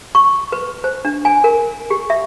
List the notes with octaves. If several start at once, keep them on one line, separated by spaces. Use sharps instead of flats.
C#6
B4
C5
D4
G#5
A#4
G4
E5